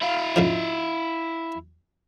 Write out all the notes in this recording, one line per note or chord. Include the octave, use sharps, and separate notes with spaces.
E4 F5
G#2 C#3 F3